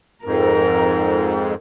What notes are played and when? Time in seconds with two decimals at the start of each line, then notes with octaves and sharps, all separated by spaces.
0.25 F2 G#2 A#4